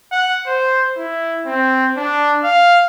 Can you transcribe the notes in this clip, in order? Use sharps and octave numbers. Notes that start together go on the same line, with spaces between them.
F#5
C5
E4
C4
D4
F5